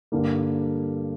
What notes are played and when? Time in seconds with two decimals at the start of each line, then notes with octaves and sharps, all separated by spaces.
0.12 G2 D3 G3 A#3